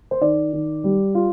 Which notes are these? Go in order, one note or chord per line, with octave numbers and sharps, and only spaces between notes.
C5
D#3 D5
D#3
G3
F4